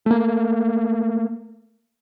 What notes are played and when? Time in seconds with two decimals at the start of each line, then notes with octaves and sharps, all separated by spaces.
0.06 A3 A#3